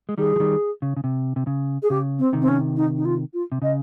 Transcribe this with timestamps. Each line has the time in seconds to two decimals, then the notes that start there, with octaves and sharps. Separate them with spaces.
0.09 G#3
0.18 D#3 G3 G#4
0.36 F3
0.40 D#3 G3
0.82 C#3
0.97 C#3
1.04 C3
1.36 C3
1.47 C#3
1.82 G#4
1.90 C#3 G4
2.19 C4
2.33 C3 D#3
2.41 C4
2.48 C#4
2.76 D#4
2.96 D#4
3.05 F4
3.33 F4
3.52 C3
3.62 C#3 D#5